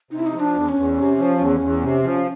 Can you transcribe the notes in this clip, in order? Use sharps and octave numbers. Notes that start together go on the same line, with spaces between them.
C3 D#4
E4
D#4
F3
D4
E2
C#4
E2
C3
F3
E2
E2
C3
F3